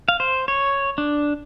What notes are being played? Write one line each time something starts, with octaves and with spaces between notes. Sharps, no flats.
F5
C5
C#5
D4